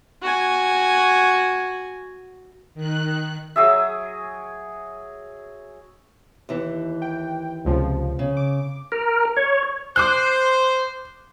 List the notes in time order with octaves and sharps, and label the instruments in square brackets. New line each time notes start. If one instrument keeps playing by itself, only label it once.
[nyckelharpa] F#4 G#5
[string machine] D#3 F#6
[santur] F#3 G#4 E5
[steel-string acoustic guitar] D#2 E3
[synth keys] G5
C#2 C3 F3
[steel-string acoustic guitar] C#3
[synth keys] D6
[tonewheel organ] A#4
C#5
[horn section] C5 [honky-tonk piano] D6 F#6